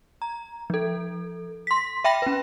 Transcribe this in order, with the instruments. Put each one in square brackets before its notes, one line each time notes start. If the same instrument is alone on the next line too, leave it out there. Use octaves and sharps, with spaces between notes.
[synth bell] A#5
F3 A4
C6 B6
E5 G5 B5 A#6
C#4 B4